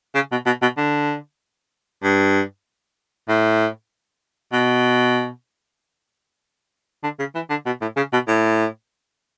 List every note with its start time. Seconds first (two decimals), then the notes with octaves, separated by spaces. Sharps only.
0.15 C#3
0.32 B2
0.46 B2
0.62 B2
0.77 D3
2.03 G2
3.29 A2
4.53 B2
7.03 D3
7.19 C#3
7.35 E3
7.50 D3
7.66 B2
7.81 A2
7.97 C#3
8.13 B2
8.28 A2